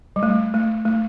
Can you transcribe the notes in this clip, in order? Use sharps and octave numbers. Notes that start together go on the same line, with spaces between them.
G3
A3
A3
A3